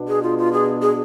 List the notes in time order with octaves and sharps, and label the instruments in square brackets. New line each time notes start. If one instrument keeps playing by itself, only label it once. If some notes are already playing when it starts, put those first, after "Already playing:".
Already playing: [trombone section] B2 B3 D4
[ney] G#4
F4
F4
G#4
G#4